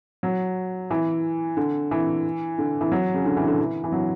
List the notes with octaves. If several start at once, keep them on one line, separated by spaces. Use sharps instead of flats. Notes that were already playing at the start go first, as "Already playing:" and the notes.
F#3
E3
D3
E3
D3
E3
F#3
C#3
D3
E3
D3
E3
E3
F#3